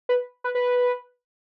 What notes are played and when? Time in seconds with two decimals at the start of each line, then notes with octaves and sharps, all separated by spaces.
0.09 B4
0.44 B4
0.55 B4